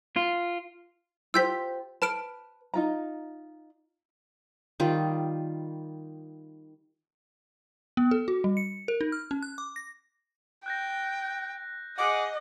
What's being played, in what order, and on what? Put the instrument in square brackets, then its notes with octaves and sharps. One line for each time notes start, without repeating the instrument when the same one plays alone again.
[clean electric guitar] F4
[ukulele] F4 G4 C5 [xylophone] E6 G6 B6
[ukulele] B4 [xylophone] A5 F6 D7
[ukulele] D#4 F4 A#5
[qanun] D#3 G3 F4
[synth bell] B3
A4
F#4
G3
C#7
A#4
D#4
F6
C#4
F#6
D6
A#6
[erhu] G5 [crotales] F#6 G6 A#6
[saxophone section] G#4 F#5 [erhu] D#5 [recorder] D6